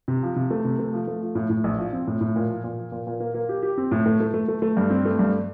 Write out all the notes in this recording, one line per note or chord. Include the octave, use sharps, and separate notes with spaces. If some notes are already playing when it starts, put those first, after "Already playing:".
C3
F3
C3
A3
C3
A3
F3
A3
F3
A2
A2
A#1
F3
C4
A2
A2
A#2
F3
A#2
F3
A#2
A#2
A#3
A#3
G4
G4
C4
A2
A3
A3
A3
A3
A3
G2
C4
A3
G2